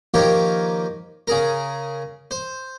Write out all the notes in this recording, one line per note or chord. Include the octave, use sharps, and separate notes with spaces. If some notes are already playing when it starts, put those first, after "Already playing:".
D#3 F3 A#3 G4 A#4 C#5
C#3 G#4 A#4
C5